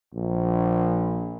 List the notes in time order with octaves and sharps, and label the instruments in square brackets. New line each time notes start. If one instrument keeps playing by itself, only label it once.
[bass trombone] A#1